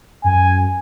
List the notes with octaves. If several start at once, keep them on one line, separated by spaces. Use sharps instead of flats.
F#2 G#5